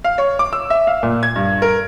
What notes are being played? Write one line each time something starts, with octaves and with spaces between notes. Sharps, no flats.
F5
C#5
D6
E6
E5
F5
A#2
G#6
G2
A#4